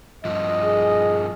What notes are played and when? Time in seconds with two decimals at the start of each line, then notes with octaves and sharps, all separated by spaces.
0.25 G2 F3 D#5
0.64 G#4